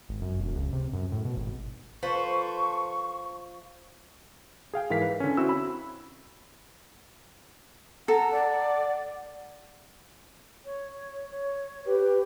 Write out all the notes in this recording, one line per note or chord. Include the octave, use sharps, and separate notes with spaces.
G#1
F#2
E1
C#2
C3
F#2
A2
B2
G#1
F3 A4 B4 C5 C#6
G#4 F5 G5
G#2 E3 A#4 F5 B6
B4
D3 C#4
C4 E4 F#4 E6
B5
A4 F#5 A#5
D5
C#5
C#5
G4 B4